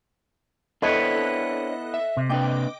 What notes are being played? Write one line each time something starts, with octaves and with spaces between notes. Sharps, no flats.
B3 D4 E4 A4 C5 C#5 D#5 F#6
E5
C3
A#3 D4 B4 D#5 G5 D6